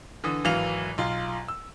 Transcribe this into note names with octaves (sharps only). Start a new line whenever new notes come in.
D3 E3 D#6
G#1 E3 F#3 F5 F7
B1 F4
E6